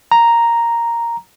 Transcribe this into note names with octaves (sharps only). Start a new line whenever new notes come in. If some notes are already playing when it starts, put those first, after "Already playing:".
A#5